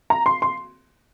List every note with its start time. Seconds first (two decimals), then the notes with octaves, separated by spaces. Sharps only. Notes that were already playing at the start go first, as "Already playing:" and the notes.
0.10 A#5
0.26 C6
0.42 C6